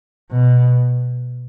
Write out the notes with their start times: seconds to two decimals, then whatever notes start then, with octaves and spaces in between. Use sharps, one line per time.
0.31 B2